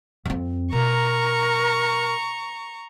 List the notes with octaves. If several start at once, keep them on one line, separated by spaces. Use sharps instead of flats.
F2 C4
B2 A#4 A#5 C#6